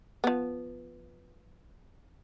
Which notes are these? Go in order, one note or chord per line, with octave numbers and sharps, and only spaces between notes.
F3 B3